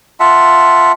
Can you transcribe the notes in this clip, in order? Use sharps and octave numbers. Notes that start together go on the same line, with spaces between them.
F4 E5 F#5 A5